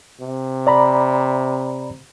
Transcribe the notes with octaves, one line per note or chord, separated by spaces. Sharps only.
C3
D5 A#5 B5